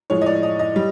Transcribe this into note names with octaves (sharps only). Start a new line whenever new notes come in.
A2 F3 G#3 C#5
D#5
D5
D#5
D#5
G3